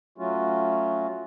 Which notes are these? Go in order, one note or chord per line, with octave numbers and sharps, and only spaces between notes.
F#3 A3 C#4 F4 F#4